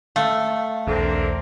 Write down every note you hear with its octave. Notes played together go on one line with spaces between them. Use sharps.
A3 F5
B1 E2 D3 C4 A#4